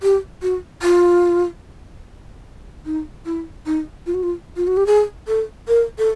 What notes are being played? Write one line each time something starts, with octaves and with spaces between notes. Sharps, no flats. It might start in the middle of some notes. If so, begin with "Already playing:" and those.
G4
F#4
F4
D#4
E4
D#4
F4
F#4
F4
F4
F#4
G4
G#4
A4
A#4
A4